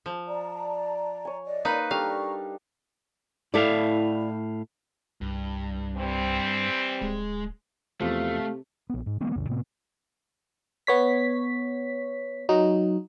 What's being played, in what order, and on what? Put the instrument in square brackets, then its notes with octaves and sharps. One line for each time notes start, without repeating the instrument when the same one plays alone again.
[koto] F3
[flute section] D5 A5 A#5
[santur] C#5 G#5
[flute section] D5 D#5
[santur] A#3 [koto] D#4 B4
[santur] G3 D4 A4 [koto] F5 [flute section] A#5 C#6
[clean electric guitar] A2 E5 F5 [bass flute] E4 [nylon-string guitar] A4 D5
[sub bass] C2 [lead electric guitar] G2
[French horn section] E3 G3 C4
[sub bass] D1 [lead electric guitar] G#3
[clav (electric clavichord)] E2 F3 [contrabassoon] C3 [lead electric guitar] A3 [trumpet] F5
[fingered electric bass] A#1 B3
G#2
E3 G#3 A#3 B3
B1 F2 C#3
A2 C3 A#3 B3
[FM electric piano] B3 C#5 B6
F#3 D#4 F#4